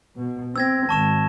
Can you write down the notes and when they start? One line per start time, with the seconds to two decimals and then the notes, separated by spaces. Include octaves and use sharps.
0.17 B2
0.56 C4 E6 G#6 A#6
0.89 G#1 A5 C#6 E7